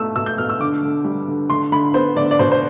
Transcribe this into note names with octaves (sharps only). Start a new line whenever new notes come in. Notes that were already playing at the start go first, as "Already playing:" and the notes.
Already playing: B2 A3 E6
B2 E6
G6
B2 F6
E6
D3 D6
D3
G3
D3
D3 C6
D3 B5
B3 C5
D3 D5
D5
B2 C5
C5